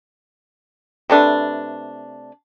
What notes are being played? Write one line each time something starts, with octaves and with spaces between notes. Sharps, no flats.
C3 A3 D4 B4